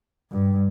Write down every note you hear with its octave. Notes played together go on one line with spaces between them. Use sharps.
G2